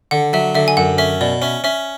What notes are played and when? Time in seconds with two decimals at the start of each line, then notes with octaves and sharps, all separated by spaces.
0.11 D3 F#5
0.33 F#3 E5
0.55 D3 E5
0.68 G#5
0.77 F#2 F#5
0.98 C#4 E5
1.21 B2 D5
1.42 C#4 E5
1.64 C#4 E5